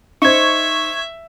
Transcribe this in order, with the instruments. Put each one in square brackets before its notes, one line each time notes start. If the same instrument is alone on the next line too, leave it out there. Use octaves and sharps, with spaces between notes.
[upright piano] D#4 C5 [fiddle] E5 [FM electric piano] C#6 G#6